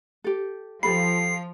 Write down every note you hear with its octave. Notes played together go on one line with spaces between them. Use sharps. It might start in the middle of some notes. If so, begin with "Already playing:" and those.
G4 A4
F3 G4 A4 B5 C7